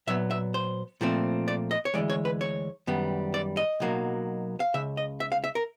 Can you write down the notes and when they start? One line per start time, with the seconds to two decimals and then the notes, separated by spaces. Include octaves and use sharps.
0.07 A#2 F#3 B3 E5
0.31 E5
0.54 C5
1.01 A#2 F3 A3 C4
1.48 D5
1.71 D#5
1.85 C#5
1.94 D2 C#3 E3 G#3 D5
2.10 C#5
2.25 B4
2.41 C#5
2.87 F#2 D#3 G3 B3
3.34 D5
3.57 D#5
3.80 B1 B2 F#3 A#3
4.60 F5
4.74 C#2 C#3 E5
4.97 D#5
5.20 E5
5.32 F5
5.44 E5
5.55 A#4